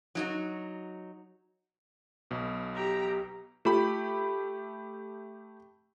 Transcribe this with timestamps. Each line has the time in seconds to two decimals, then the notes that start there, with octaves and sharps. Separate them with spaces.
0.15 F#3 D#4 F#4
2.31 B1 B2
2.75 G4 A#5
3.65 A3 F4 G4 B5